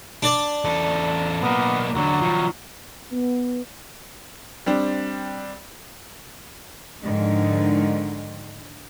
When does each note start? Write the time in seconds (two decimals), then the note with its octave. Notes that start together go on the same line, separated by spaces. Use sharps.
0.23 D4 D5
0.65 E2 A4
1.43 B1 A#3 B3
1.95 E2 D3 F#3
2.21 D#3 F3
3.12 B3
4.66 G3 C4 D4
7.05 G#2 D3 D#3 F3